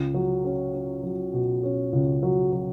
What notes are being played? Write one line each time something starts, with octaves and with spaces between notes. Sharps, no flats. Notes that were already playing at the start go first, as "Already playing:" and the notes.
Already playing: C#2
F#3
C#4
C#4
F#3
B2
C#4
C#2
F#3
F#3